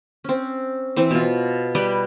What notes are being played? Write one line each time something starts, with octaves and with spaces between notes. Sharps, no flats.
C4 C#4
E3 C4
B2 F4
G3 G4 B4